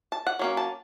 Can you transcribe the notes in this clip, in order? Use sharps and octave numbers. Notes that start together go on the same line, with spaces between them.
A5
F#5
F#3 A#3 C#4
A5